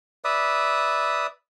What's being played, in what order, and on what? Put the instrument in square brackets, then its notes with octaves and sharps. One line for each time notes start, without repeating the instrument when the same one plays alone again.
[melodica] B4 D5 E5 D#6